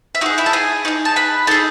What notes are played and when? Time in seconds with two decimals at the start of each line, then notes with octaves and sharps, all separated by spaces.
0.15 E5
0.21 D#4 F#4 F#5
0.26 G#4
0.38 E4 E5
0.46 A5
0.53 G#4 G#5
0.85 D#4 G#4
1.05 A5
1.16 B4 B5
1.47 D#4 G#4 A4 A5